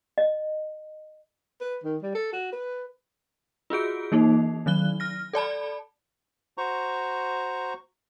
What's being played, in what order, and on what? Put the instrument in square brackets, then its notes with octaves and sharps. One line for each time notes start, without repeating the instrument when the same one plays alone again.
[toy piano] D#5
[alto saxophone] B4
D#3
G3
A4
F#4
B4
[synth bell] F4 F#4 G#4 D7
E3 A#3 D#4
D#3 F#3 F#6 G7
F6 A#6
A4 D5 A5 B5
[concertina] F#4 C5 A#5 C#6